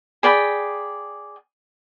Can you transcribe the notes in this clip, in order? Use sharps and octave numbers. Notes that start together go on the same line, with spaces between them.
G#4 D5 G5 B5